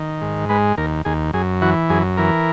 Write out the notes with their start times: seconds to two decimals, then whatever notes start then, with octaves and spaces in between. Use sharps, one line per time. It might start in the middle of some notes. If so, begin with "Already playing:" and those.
Already playing: D#3
0.22 G#2
0.49 G#3 B4
0.78 D#2 A#4
1.05 D#2 G#4
1.33 F#2 G#4
1.62 E3 F#4
1.89 F#2 G#4
2.17 E3 A#4